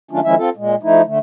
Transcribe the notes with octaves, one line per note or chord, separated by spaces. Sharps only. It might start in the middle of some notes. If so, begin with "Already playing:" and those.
D#3 F#3 A3 C#4 D4 F4
D#3 F3 G#3 C#4 E4 E5
C4 F4 A4
A#2 G#3
F3 A3 D#4 E4
D3 A3